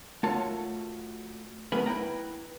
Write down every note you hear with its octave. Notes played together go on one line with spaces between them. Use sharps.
A3 F4 F#4 A#4 C#5 A5
F#3 A3 B3 G#4 A#4 B4
E4 B4 G5 A#5